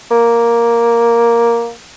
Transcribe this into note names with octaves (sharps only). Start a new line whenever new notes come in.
A#3